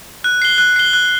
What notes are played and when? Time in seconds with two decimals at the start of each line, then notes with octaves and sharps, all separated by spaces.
0.24 F#6
0.42 C7 G7
0.58 F#6
0.76 C7 G7
0.93 F#6